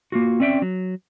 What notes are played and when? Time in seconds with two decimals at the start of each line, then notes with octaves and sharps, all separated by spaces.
0.12 A#3 F4 F#4
0.40 C4 C#4 D5 E5 G5
0.62 F#3